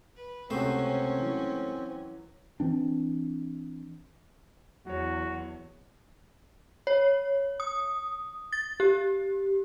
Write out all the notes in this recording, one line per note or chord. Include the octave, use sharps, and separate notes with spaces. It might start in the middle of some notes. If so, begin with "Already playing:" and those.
B4
C#2 C3 A3 C4 C#4 F#4 C5
E3 F#3
E3 C4 D4
E2 F#3 F#4 C#5
C#5
D#6
A6
G4